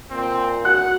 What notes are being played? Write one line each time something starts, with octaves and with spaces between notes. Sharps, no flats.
A#2 C4
F#4 F#5 F#6